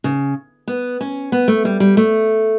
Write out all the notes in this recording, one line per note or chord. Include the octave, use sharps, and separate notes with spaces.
C#3
B3
C#4
B3
A3
G3
G3
A3